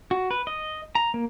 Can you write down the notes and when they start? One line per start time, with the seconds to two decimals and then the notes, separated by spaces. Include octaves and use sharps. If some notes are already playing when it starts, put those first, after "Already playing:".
0.11 F#4
0.31 B4
0.47 D#5
0.95 A#5
1.14 A#3